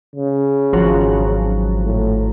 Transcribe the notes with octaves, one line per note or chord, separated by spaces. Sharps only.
C#3
G#1 F3 F#3
A2